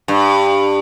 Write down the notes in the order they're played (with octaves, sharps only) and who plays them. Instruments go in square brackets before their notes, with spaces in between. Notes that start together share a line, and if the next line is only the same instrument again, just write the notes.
[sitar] G2